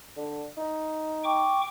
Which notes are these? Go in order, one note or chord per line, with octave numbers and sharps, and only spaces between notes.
D3
D#4
G5 C#6 D6